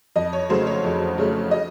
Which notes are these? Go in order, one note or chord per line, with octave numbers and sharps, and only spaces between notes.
F2 D#5
C#5
C#3 F#3 A3 C5
C#5
F2
C#3 F#3 A3
D#5